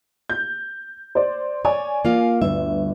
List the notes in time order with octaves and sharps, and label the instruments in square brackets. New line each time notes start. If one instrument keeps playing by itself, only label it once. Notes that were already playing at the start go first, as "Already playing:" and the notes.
[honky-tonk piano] G6
C5 D5
[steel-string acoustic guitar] C#5 [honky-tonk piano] D5 G#5
[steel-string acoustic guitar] A#3 F4 F5
[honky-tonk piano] G1 [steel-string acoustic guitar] D2 E5